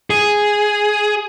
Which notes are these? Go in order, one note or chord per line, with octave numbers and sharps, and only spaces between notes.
G#4